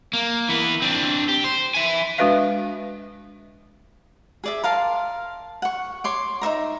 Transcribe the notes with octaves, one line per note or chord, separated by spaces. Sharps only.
A#3
E3 B3
C4 D4
G4
C5
E5 G#5
G#3 D4 F#4 B4 E5 F5
G#4 D5 E5
A#4 F5 A5 C6
F#5 C#6
C#5 C6 D6
D#4 C5 E5 A#5